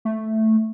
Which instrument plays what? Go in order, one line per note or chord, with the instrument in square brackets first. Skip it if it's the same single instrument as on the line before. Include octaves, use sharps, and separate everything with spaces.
[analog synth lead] A3